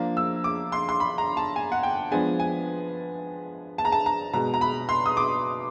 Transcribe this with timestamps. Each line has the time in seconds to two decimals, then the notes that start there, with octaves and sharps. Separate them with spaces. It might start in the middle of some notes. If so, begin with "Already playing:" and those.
Already playing: F3 A#3 D4
0.17 E6
0.44 D6
0.72 C6
0.89 C6
1.00 B5
1.18 A#5
1.37 A5
1.56 G#5
1.72 F#5
1.83 G5
2.11 F3 G#3 B3 D4 G#5
2.40 G#5
3.78 A5
3.85 A#5
3.92 A5
4.06 A#5
4.33 B2 G#3 B3 A#5
4.54 A#5
4.61 B5
4.89 C6
5.06 D#6
5.17 D6